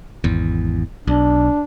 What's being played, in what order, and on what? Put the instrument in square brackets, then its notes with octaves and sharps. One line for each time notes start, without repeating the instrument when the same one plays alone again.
[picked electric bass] G#1 E2
[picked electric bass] B1 [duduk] D4